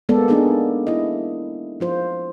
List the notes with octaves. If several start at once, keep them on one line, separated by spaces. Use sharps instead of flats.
G#3 A#3 B3 A4 D5
A#3 B3 D4 D#4 G#4 A4
E4 D#5
F3 F4 C5